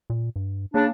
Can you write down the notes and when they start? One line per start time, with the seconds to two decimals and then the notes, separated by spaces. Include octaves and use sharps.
0.10 A#2
0.36 G2
0.74 C#3 A#3 D4